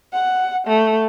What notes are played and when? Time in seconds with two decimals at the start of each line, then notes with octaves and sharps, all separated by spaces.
0.13 F#5
0.67 A3